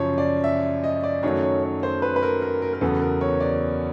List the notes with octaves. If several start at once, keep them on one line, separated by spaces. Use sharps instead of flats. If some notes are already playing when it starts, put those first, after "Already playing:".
Already playing: F#2 C#3 F3 C#5
D5
E5
D#5
D5
F#2 D#3 F#3 A3 C#5
C#5
C#5
C5
B4
B4
A#4
A#4
A#4
A#4
E2 C#3 F#3 B3 A4
A#4
C#5
D5